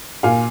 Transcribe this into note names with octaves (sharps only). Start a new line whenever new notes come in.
A#2 F5 G#5